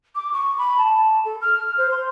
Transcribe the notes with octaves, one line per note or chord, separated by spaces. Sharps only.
D6
C#6
B5
A5
A4
F6
C5
C6